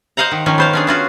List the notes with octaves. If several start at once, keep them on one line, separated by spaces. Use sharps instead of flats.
C5 D#5 F5 F#5 A#5
D#3
D#3 F3 C#4
B3 C5 F5
C#4 D4 G#4
C#4 F4 F#4